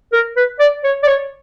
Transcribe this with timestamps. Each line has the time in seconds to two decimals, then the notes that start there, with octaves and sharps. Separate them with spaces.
0.12 A#4
0.36 B4
0.59 D5
0.84 C#5
1.03 D5
1.07 C#5